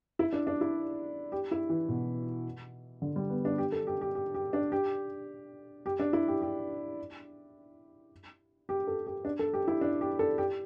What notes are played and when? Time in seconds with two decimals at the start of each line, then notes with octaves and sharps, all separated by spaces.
0.19 E4
0.33 D4
0.47 D4
0.61 E4
1.32 G4
1.51 E4
1.70 E3
1.89 B2
3.02 D3
3.16 G3
3.30 B3
3.45 D4
3.58 G4
3.72 A4
3.87 G4
4.01 G4
4.15 G4
4.34 G4
4.53 D4
4.72 G4
5.86 G4
5.99 D4
6.13 E4
6.28 G4
6.42 G4
8.69 G4
8.87 A4
9.07 G4
9.25 D4
9.39 A4
9.54 G4
9.68 E4
9.81 D4
10.01 G4
10.19 A4
10.38 G4